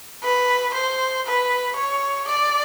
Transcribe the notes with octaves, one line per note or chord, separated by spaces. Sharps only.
B4
C5
B4
C#5
D5